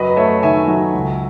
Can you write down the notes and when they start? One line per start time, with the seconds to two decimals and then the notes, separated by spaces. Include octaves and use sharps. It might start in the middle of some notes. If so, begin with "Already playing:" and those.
Already playing: F#2 F#3 B4 D#5
0.16 A3 C#5 E5
0.43 D#3 E5 G#5
0.68 F#3
0.93 C#2